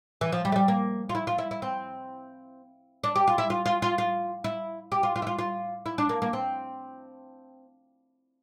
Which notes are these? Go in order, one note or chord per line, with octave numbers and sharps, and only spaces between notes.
E3
F3
G3
A3
G3
A#3
F4
E4
F4
E4
E4
C4
D4
G4
F4
E4
F4
F4
F4
F4
E4
G4
F4
F4
E4
F4
F4
E4
D4
A#3
A#3
C4